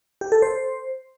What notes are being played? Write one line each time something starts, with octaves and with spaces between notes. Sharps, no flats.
G4
A4
C5